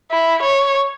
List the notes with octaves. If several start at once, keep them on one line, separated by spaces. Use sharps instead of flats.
E4
C#5